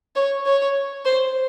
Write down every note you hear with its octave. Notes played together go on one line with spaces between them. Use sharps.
C#5
C#5
C5